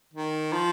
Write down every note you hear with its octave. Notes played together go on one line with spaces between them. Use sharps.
D#3
F3